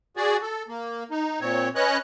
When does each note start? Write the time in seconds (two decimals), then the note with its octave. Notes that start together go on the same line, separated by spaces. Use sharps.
0.17 F#4 G#4 D5
0.42 A4
0.68 A#3
1.11 D#4
1.41 A#2 C4 C#5
1.75 C#4 B4 C#5 D#5 F#6